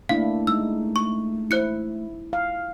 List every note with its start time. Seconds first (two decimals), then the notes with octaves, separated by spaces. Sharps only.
0.09 A3 A#3 D4 E4 F5
0.47 G#3 D#4 E6
0.96 C#6
1.51 E4 C5 F#6 C#7
2.33 F5